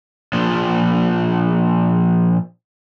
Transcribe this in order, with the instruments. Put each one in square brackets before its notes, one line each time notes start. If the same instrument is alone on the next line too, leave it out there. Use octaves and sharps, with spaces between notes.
[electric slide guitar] A#2 F3 D4